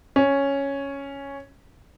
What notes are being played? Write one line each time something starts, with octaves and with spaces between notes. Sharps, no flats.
C#4